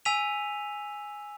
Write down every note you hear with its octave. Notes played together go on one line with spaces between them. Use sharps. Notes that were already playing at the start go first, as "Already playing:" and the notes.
G#5 E6 B6 D#7 F7